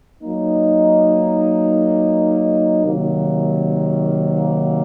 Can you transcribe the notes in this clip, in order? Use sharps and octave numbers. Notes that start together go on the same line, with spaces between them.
F#3 A#3 D#4
C3 D#3 F#3 A#3